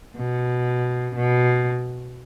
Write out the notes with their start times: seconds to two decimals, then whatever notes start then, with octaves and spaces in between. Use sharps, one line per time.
0.17 B2
1.16 B2